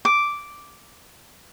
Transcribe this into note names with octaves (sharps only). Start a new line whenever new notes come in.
D6